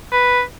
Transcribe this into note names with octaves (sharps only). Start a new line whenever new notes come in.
B4